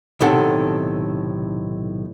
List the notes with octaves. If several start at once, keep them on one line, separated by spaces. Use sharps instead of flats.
B1 A2 C3 D#3 A4 F#5